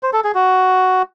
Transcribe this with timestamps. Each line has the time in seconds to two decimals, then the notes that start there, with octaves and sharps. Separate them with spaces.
0.03 C5
0.13 A4
0.24 G#4
0.35 F#4